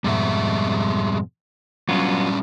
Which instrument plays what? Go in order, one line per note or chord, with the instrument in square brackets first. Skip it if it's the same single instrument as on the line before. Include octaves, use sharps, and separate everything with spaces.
[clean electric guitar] F2 G#2 B2 [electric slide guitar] G3 G#3 E5
[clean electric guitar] F#3 B3 F4 [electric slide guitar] G3 C#4 D4